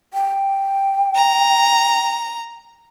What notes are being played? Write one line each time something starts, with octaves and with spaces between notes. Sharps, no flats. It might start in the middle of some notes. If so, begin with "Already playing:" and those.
G5
A#5